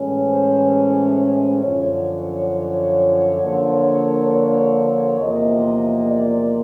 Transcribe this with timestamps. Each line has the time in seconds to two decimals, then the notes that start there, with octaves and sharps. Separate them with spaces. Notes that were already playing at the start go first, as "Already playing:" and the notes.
Already playing: A2 E3 G#3 C#4
0.29 C5
0.74 C5
1.63 F#2 D3 F3 C#5
3.41 D3 F3 A#3 D4
4.30 C#5
5.19 E2 C3 F3 A#3 D#5
6.08 D5